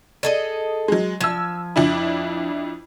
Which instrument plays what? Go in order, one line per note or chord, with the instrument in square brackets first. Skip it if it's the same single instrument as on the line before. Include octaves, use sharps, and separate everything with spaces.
[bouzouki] G#4 A4 D#5
[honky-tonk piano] F#3 G#3
[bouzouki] F3 [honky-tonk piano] E6 G#6
[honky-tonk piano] F2 D4 E4